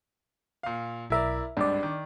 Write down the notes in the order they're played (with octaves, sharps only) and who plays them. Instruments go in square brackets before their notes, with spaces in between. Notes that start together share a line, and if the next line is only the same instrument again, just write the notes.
[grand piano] A#2 F5
[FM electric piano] B1 E5 [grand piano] E4 A#4 D5
[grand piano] G#1 C#2 G2 [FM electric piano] D4 D5
[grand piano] D#3